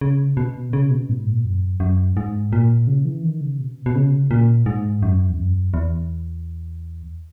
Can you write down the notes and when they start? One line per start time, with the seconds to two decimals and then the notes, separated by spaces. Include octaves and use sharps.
0.01 C#3
0.37 B2
0.73 C#3
0.91 B2
1.09 G#2
1.27 A#2
1.45 F#2
1.80 F#2
2.17 G#2
2.53 A#2
2.87 C#3
3.05 E3
3.24 D#3
3.41 C#3
3.60 B2
3.86 B2
3.95 C#3
4.31 A#2
4.66 G#2
5.02 F#2
5.30 E2
5.38 F#2
5.74 E2